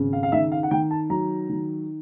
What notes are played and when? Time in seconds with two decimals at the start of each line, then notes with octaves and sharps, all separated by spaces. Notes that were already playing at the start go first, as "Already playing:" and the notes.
Already playing: G#1 C#3
0.13 F5
0.23 F5
0.32 D#3 E5
0.52 F5
0.63 F#5
0.71 D#3 G5
0.91 A5
1.10 F#3 A#5
1.49 D#3